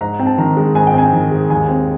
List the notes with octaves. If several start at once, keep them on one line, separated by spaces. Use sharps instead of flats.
G#2 A#5
C4
A5
D#3 A#5
G#3
G#2 G#5
G5
C4 G#5
D#3
G#3
D#2 G#5
C4